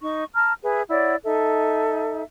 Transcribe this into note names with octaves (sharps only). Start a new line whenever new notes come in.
D#4 C#6
A5 A#5 F6
G#4 B4 E5 G#5
E4 C#5 D5 F#5
D#4 A4 E5